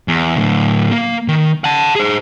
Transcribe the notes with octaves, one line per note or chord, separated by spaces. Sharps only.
E2
A2 D3
A#3
D#3
F#5 A5
G#4 C5